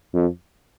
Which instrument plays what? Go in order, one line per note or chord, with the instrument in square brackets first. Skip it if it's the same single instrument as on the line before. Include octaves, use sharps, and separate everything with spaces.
[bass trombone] F2